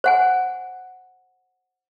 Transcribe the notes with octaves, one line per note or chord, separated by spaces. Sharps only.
C5 F#5 G#5